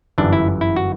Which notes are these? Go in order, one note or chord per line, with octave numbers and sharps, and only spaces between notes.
G1 F#2 E3 D4
E4
E4
F#4